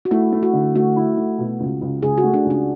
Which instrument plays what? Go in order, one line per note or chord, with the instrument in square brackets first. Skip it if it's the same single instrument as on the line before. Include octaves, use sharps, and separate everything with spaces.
[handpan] F#4
[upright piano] A3 [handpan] E4
[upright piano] A3
[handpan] F#4
[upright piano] D3
[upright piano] A3 [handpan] F#4
[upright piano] E4
A3
B2
C#2
C#2
[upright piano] C#2 [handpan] G#4
[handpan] F#4
[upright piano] A3
[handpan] D4
[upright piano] C#2
[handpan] D4